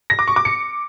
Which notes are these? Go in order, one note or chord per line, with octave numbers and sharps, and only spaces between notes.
A#6
D6
C#6
D6
C#7